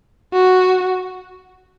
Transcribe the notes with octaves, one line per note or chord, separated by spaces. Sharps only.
F#4